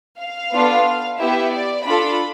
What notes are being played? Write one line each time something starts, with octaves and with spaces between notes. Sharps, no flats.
F5
B3 D4 F4 A4
B3 E4 G4 E5
D5
D4 F4 A4 B5